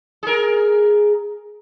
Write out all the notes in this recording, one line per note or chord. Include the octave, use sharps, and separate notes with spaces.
G#4 A#4